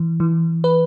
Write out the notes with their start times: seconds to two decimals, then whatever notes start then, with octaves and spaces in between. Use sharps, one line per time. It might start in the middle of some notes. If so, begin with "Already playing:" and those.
Already playing: E3
0.20 E3
0.64 B4